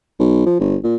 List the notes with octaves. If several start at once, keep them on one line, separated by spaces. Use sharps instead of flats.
B1
F3
G1
A#2